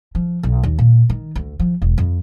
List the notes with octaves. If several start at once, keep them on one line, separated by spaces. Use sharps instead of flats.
F3
B1
D#2
A#2
D#3
D2
F3
E1
F2